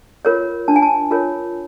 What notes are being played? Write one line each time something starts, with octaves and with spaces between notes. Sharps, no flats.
F4 A#4 C#5
D4 A5
G#5
A5
F4 A#4 C#5